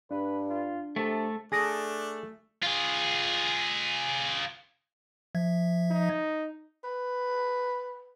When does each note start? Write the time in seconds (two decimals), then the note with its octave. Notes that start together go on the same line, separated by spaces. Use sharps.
0.11 G2 D4 B4
0.50 F4
0.96 C3 A3 A4
1.52 A3 D4 G#4 D#6 A#6 D7
2.63 F4 G#4
5.35 F3 E5 G#6
5.91 D#4
6.84 B4